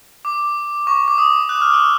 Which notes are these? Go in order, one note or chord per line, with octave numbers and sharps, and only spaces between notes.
D6
C#6
D6
D#6
F#6
F6
E6